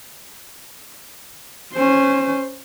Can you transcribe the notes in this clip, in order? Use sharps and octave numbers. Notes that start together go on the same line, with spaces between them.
C#4 C5